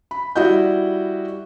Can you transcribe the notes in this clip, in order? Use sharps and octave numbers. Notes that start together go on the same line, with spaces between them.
B5
G3 E4 F#4 D#5 G6